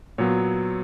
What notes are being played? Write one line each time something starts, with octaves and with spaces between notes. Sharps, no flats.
A#2 F#3 B3 C#5